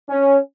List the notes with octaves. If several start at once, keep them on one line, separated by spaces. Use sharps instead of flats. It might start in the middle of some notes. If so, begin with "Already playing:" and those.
C#4